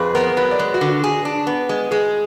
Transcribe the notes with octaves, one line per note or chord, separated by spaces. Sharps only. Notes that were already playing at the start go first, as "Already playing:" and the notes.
Already playing: F2 G#4 B4
B3 A#4
F#3 B4
D5
G#3 B4
F#4
D3
F#4
G#4
D4
B3
G#3
G#3 G#4